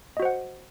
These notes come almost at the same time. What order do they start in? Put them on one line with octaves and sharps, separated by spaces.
D#5 F#4 C5 F#5